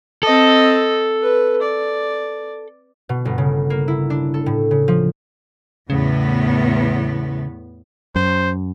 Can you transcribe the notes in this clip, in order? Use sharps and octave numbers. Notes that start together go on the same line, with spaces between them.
C4 A4 D#5
B4
D5
B2
G1
C#3
A#3
E4
D4
A4
A2
C#3
F3
E2 A2 C#3 B3
F#2 C5